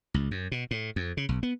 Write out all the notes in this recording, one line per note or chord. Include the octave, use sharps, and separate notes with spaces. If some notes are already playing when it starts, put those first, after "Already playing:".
C#2
F#2
B2
A2
F2
C#3
B1
B3